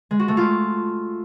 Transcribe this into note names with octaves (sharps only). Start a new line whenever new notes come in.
G#3
F#4
A3
F4